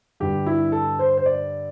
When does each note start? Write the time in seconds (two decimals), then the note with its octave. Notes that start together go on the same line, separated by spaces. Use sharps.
0.20 G2 D3 G4
0.46 E4
0.72 A4
0.99 C5
1.18 C5
1.26 D5